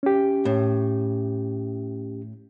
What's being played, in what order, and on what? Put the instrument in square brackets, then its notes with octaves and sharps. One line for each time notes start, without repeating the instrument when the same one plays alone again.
[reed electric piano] C#4 G4
[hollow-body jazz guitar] A2